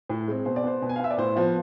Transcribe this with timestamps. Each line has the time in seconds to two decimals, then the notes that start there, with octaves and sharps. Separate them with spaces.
0.09 A2
0.28 G#3 C4
0.45 B2 C5
0.56 D5
0.64 B3 C5
0.82 B2
0.89 G#5
0.96 F5
1.00 B3 E5
1.10 D5
1.18 A2 C5
1.36 F3 B3